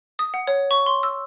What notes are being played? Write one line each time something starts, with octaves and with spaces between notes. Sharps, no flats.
D#6
F#5
C#5
C#6
C6
E6